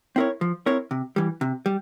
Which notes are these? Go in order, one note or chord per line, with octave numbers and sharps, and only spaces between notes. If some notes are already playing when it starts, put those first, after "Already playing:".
C4 E4 A#4 C#5
F3
C4 E4 A#4 C#5
C3
E3 G3
C3
G3